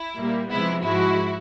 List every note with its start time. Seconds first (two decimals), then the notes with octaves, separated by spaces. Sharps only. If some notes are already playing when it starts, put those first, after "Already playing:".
Already playing: E4
0.18 A#2 G3 A#3
0.51 C3 F3 G#3 B3 E4
0.84 G#2 F3 G#3 E4 F#4